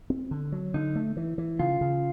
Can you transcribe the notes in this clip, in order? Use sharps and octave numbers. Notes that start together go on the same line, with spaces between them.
C4
D3
F#3
D3 D#4
A3
E3
E3
C#3 F4
C#3